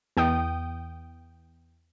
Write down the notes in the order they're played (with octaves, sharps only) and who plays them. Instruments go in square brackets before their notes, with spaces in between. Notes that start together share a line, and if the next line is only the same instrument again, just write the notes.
[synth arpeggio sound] E2 G5 D#6